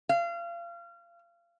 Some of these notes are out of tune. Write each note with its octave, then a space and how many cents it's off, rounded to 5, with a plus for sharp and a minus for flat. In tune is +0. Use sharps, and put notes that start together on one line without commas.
F5 -30